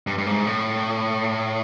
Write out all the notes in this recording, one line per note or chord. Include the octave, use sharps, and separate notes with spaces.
G2
G2
G#2
A2